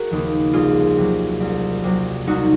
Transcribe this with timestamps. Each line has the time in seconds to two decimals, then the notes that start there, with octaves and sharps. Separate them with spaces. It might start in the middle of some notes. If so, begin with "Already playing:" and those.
Already playing: F#4 G#4 A#4
0.11 D#2 C#3 F3
0.53 C2 F4 G#4
0.97 C3 F#3
1.40 C2
1.84 C3 F#3
2.27 C2 D#4 F#4